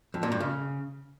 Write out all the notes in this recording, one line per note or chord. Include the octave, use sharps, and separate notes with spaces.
F2
A#2
G2
C#3